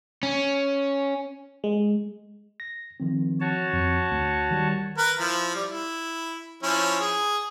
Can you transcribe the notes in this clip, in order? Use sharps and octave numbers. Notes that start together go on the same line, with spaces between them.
C#4
G#3
A#6
D#3 F3 C4
F#4 C#5 A5
F2
D2
D#3 G3
A#4 B4
F3 E4
G3
E4
F3 C#4 E4
G#4